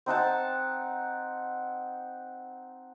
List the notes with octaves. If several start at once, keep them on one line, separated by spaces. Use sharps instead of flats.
C4 D#4 F#5 A5